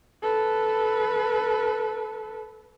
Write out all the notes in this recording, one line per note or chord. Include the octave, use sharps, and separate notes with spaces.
A4 B4